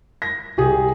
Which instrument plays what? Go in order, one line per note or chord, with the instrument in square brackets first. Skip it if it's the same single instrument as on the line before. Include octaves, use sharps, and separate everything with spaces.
[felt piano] A#6
[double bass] C2 [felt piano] G4 G#4